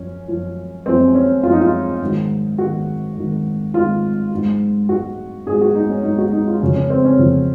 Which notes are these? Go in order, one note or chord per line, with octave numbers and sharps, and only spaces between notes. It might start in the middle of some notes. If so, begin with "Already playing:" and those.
Already playing: F#2 F3 C#4
F#2 F3
F#2 F3 C4
C#4
F#2 F3 F4
D#4
F4
G#2 D#3 F#3
G#2 D#3 F#3 F#4
G#2 D#3 F#3
G#2 D#3 F#3 F4
G#2 F#3
G#2 F#3 F#4
G#2 F#3 G#4
F#4
D#4
C#4
G#2 F#3 D#4
F#4
D#4
F4
F2 C#3 F#3 C#4
C#4
C4
C#4
F2 C#3 F#3